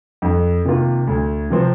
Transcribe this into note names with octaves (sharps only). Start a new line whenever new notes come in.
F2
C3 D#3 A#3 F4
D2
C3 F3 C4